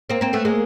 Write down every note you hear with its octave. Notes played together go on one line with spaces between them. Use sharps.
A#3 C4
A#3 C4
A3 B3
G#3 A#3